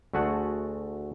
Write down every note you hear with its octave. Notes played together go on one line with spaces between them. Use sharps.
D2 A3 F#4 G#4 F#5 A5